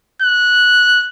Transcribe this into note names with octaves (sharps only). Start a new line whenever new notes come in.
F#6